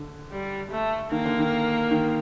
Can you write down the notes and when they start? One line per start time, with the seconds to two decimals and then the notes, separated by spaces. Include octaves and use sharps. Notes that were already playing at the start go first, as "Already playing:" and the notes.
Already playing: D3
0.32 G3
0.71 A3
1.11 D#3 A#3
1.25 D3
1.39 D#3
1.91 D#3